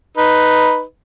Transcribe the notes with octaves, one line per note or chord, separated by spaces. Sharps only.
D#4 B4